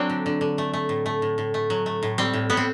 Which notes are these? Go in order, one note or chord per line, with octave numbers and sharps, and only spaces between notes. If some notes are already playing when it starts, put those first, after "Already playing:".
Already playing: F#3 C4 D4
D3
D3
D3
A3
A3
A2
A3
A2
A2
A3
F#3
A3
A2
G3 C4
A2
A2 B3
C4